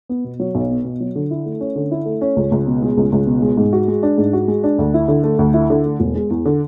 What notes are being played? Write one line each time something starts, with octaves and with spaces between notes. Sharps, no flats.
B3
B2
F#3
B1
B3
B2
F#3
D3
E4
A3
C#4
D3
E4
A3
C#4
C#2
C#2
B2
G#3
C#2
C#2
B2
G#3
G#2
F#4
G#3
D4
G#2
F#4
G#3
D4
D2
E4
D3
A3
D2
E4
D3
A3
E1
G#3
E2
D3